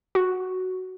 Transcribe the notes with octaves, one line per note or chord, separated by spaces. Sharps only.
F#4